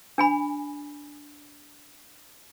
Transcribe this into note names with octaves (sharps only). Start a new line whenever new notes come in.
D4 G#5 B5